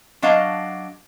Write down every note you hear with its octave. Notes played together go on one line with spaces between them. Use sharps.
F#3 D4 D#5 F5 A5 A#5